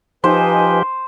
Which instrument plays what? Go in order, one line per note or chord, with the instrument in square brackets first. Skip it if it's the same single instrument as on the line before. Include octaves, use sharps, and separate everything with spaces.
[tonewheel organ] F3 G4 [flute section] D#4 B4 G#5 [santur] C5